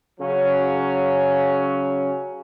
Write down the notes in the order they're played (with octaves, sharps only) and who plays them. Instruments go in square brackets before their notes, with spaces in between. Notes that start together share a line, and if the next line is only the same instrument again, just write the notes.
[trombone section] C#3 F#3 C#4